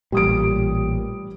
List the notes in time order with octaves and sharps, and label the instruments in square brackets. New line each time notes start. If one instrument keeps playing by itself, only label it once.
[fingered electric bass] A1 A#2 [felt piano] G3 D#6 D7